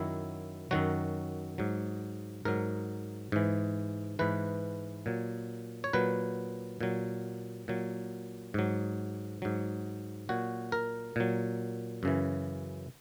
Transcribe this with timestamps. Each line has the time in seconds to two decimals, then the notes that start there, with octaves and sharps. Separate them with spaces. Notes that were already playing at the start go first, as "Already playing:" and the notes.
Already playing: F#2 D#3 F#3 E4
0.71 F#2 D#3 F#3 F#4
1.58 G#2 F#3
2.45 G#2 F#3 A#4
3.32 G#2 E3
4.19 G#2 E3 B4
5.06 A#2 F#3
5.84 C#5
5.93 A#2 F#3 B4
6.81 A#2 F#3
7.68 A#2 F#3
8.54 G#2 F#3
9.42 G#2 F#3
10.29 A#2 F#3 F#4
10.72 A#4
11.16 A#2 F#3
12.03 F#2 C#3 E3